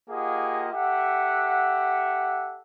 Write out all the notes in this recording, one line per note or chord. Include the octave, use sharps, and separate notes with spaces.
A#3 F4 G4 G#4 D#5 F#5
G4 A4 E5 F#5